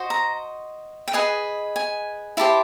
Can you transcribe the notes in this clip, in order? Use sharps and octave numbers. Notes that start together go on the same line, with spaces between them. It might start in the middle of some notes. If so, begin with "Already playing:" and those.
Already playing: F#4 C5 D#5
A#5
G5
G#4 B4 D#5 G#5
G#5
E4 G4 C5 A5